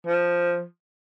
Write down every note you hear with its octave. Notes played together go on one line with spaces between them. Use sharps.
F3